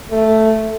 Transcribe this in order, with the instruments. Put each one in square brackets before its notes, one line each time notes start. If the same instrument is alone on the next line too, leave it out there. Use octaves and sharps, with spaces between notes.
[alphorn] A3